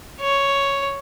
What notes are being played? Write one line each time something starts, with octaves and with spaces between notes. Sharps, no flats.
C#5